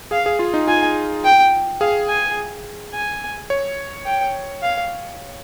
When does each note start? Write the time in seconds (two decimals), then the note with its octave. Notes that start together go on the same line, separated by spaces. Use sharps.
0.11 G#4 F5
0.26 G#4
0.39 F4
0.54 D#4
0.67 F4 G#5
1.24 G5
1.81 G#4 F5
2.08 G#5
2.93 G#5
3.50 C#5
4.06 G5
4.63 F5